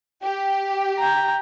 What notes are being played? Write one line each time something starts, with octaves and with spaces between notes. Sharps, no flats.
G4
G5 A#5